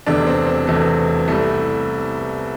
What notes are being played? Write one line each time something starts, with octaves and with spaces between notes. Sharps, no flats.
E1 E2 C3 A3 D4
C4
C4
E1 E2 C3 A3
C2 C3 G3 A3